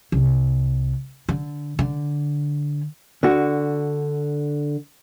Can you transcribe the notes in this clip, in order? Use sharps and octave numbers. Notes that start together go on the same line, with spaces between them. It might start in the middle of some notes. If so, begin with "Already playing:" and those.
C2
D3
D3
D3 F#4